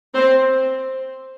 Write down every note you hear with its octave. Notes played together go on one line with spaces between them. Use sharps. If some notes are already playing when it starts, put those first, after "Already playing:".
C4 C5